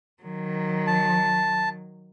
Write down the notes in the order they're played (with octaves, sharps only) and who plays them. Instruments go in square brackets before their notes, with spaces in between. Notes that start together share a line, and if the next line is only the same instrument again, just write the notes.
[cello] D#3 F#3
[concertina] A5